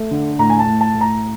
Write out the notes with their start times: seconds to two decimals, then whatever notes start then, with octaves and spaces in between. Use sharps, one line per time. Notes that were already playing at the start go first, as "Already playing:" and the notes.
Already playing: A3
0.11 D3
0.39 A2 A#5
0.50 G#5
0.59 A5
0.67 A2
0.81 A5
0.94 A2
1.01 A#5